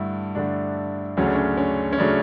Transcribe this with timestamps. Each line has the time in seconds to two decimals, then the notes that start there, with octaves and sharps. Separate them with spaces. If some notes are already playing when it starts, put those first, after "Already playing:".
Already playing: G2 D3 A3 E4
0.35 G2 D3 A3 D4
1.17 D2 C#3 F#3 A3 C#4
1.26 D4
1.35 C#4
1.57 C#4
1.93 C#4
1.99 C#3 F#3 A3 D4